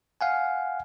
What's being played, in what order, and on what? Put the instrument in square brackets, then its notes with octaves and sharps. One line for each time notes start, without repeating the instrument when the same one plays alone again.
[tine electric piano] F5 F#5 G#5